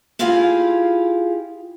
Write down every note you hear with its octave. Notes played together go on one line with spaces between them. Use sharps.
E4 F4 G4 G#4 F5